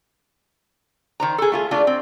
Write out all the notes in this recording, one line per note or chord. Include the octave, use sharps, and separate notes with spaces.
D#3 C5 A#5
G#4 A4
A3 F4 G#4
A3 D4 F4
C4